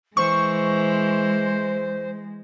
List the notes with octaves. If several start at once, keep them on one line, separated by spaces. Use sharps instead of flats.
E3 G#3 C5 C#6